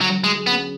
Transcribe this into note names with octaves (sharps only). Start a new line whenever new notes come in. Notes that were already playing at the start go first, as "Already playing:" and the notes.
D3 F#3
F#3
G#3
G#4
B3
C#4